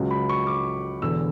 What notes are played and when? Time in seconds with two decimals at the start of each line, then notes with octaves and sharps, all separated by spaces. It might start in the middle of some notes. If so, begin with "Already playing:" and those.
Already playing: C#2 C#3 F#3
0.11 B5
0.29 C#6
0.47 D6
1.02 E1 E2 D3 E6